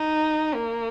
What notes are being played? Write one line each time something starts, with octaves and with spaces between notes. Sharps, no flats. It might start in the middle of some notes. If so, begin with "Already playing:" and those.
Already playing: D#4
A#3